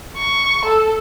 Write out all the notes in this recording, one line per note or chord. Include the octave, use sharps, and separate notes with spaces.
C#6
A4